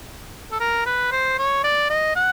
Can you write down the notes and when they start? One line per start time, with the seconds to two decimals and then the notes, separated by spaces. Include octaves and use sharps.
0.52 A4
0.60 A#4
0.86 B4
1.12 C5
1.38 C#5
1.64 D5
1.90 D#5
2.16 F#5